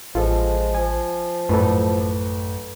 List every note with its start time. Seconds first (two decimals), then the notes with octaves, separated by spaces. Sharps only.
0.15 A1 F3 G#3 F4 A4
0.75 F3 G#5
1.49 A1 F#2 A4 B4